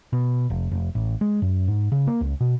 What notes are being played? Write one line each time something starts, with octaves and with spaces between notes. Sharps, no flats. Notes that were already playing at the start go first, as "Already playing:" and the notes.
B2
F1
F1
A1
G#3
F#2
G#2
C#3
A#3
C#2
B2